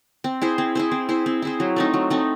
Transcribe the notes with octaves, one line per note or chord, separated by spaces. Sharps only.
C4
E4 G#4 C5
C4
E4 G#4 C5
C4
E4 G#4 C5
C4
E4 G#4 C5
F#3
A3 C4 D#4
F#3
A3 C4 D#4